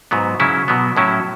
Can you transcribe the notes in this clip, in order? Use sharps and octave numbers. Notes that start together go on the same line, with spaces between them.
G#2 F#3 B3
C#3 F#3 C#4 E4
B2 F#3 B3
A2 F#3 C#4 E4